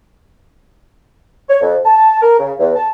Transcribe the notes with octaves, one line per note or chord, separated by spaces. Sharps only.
C#5
F2
A5
A#4
C#3
E2
A5